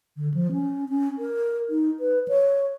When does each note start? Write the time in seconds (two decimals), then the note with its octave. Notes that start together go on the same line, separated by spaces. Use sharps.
0.17 D3
0.34 F3
0.52 C#4
0.89 C#4
1.18 A#4
1.69 D#4
2.00 B4
2.28 C#5